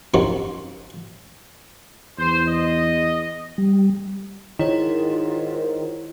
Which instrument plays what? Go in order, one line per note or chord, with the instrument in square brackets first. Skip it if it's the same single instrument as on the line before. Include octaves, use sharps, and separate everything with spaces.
[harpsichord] F#2 C3 D#3 F3 F#3 C4
[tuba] E2 [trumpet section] C5
[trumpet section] D#5
[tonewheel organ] G3
[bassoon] G#2 [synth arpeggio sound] D#3 [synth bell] E4 C#5 [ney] F4